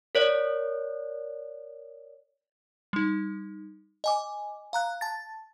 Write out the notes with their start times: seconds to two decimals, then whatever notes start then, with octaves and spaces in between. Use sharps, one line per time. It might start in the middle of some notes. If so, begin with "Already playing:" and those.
0.15 A#4 C#5 D5
2.93 G3 D#4
4.04 D#5 G#5 D6
4.73 F5 A#5 F#6
5.01 A5 A6